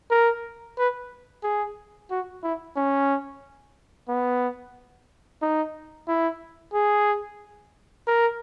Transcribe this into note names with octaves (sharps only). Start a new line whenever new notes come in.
A#4
B4
G#4
F#4
E4
C#4
B3
D#4
E4
G#4
A#4